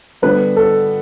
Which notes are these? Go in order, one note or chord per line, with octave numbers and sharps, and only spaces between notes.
D3 G3 B3 B4
A4